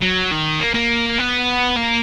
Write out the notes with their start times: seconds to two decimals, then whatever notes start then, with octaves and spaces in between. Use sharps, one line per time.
0.02 F#3
0.31 D#3
0.60 A#3
0.74 A#3
1.19 B3
1.76 A#3